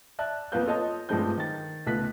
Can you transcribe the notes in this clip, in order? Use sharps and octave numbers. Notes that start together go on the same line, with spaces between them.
D5 E5 A5 F#6
F2 A#3 B3 B4 F5 G6
F4 A4 C#5 D#5 A5 D#6
G2 F3 G#3 A3 C4 G6
D#3 A6
C#2 A3 B3 F#6 B6